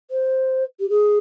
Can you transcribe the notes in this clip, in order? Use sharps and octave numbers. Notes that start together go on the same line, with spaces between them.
C5
G4
G#4